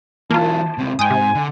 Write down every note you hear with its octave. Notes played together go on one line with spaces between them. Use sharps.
E3 F#3 A#3 F4 A5
C#2 C3
G#2 G5 G#5 D#6
C3
D3